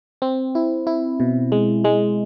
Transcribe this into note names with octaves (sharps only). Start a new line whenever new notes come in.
C4
E4
E4
B2
G#3
G#3